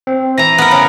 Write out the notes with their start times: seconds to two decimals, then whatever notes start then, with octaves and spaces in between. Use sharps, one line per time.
0.07 C4
0.38 E3 A#5 A#6
0.58 B3 A#4
0.71 C#3